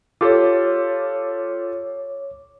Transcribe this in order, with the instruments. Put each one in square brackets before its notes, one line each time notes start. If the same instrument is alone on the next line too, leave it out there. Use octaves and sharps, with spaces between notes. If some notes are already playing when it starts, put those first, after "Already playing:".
[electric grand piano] F4 G4 A4 [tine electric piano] C#5 D6